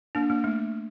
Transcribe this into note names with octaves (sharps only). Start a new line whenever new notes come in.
A#3 D4
A#3
A3